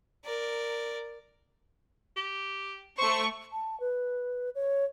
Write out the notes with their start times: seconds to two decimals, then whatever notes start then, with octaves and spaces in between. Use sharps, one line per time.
0.25 A#4 D5
2.17 G4
2.98 A3 C5 C#6
3.52 A5
3.80 B4
4.55 C#5